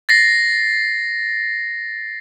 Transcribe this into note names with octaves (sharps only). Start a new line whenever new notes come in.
A6 A#6 C7